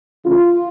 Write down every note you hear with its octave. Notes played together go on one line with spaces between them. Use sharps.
C#3 E3 A3 C#4 F4